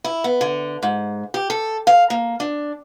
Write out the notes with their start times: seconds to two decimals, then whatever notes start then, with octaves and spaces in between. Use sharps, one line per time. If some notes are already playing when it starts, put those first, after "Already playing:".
0.04 E4
0.24 B3
0.41 D3
0.83 G#2
1.34 G4
1.50 A4
1.87 F5
2.10 A#3
2.40 D4